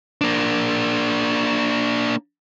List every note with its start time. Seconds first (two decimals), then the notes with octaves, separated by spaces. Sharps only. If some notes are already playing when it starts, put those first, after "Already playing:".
0.21 A#3 D4